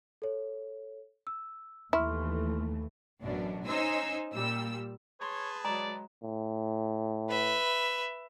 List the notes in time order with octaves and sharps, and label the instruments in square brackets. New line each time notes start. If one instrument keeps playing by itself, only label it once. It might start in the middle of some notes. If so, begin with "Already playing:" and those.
[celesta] A4 C#5
E6
[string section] D#2 E3 A3 [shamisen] E4 [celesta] C6 C#6 F6
[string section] A1 F#2 B2 D4
C#4 D#4 C5 G#5 E6
A#2 G3 E6
[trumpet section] G#4 B4 A5 [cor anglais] C#5 [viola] C6
[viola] F#3 G#3 [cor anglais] D5 [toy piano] A#5
[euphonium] A2
[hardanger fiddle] B4 E5